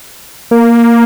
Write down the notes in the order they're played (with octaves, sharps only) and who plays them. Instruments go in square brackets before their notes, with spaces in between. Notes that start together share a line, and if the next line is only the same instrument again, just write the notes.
[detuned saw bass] A#3